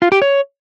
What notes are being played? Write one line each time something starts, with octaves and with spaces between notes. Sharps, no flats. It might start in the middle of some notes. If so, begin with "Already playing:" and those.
F4
G4
C#5